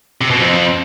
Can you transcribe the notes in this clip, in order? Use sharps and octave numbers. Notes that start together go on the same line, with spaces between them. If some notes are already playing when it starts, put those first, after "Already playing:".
C3
B2
F2